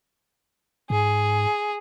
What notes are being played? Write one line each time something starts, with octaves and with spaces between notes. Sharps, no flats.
G#2 G#4